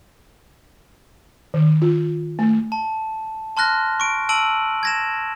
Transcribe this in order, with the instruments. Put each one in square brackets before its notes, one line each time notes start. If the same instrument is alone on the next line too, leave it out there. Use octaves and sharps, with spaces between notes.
[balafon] D#3
F4
A3
[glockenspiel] A5
A5 C6 F6 F#6 A#6
C#6 D7
A5 E6 D7 D#7 F#7
G#6 A#6 E7